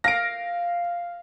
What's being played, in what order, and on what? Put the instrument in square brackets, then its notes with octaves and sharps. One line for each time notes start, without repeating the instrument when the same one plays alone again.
[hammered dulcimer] F5 [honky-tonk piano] A#6 D7